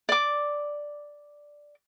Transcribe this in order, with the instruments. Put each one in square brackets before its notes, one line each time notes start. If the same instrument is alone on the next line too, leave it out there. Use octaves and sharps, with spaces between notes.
[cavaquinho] D5 D6